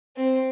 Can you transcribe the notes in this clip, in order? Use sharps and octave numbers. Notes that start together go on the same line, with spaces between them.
C4